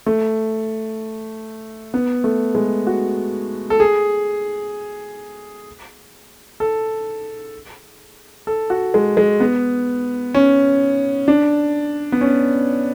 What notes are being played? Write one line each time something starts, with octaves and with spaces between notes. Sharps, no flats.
A3
B3
A3
G#3
F#4
A4
G#4
A4
A4
F#4
G#3
G#3
B3
C#4
D4
B3
C#4